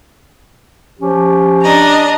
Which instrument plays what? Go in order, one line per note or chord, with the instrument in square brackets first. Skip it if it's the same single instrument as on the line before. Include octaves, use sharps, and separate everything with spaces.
[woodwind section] F3 C#4 G4
[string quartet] D4 D#5 A#5